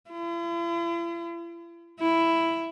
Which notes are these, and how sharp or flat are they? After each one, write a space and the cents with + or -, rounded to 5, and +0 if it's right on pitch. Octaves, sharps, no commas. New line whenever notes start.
E4 +45
E4 +5